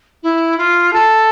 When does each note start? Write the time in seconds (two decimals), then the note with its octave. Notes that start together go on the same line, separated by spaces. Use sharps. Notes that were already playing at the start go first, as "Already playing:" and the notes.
0.22 E4
0.57 F4
0.92 A4